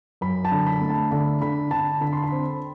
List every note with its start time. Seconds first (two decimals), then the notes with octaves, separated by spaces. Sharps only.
0.21 F#2 B5
0.45 A5
0.52 D3
0.67 B5
0.81 A3
0.89 A5
1.11 D3 B5
1.42 D3 B5
1.71 D3 A5
2.01 D3 B5
2.13 C6
2.24 B5
2.32 C4